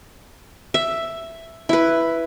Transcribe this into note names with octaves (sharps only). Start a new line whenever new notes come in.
E5
E4 B4